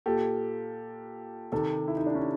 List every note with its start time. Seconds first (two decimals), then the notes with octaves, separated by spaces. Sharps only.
0.06 A#2 G4 A4
1.52 C3 D#3 G4 A4
1.88 E4
1.97 D#4
2.07 D4
2.14 C#4 D#4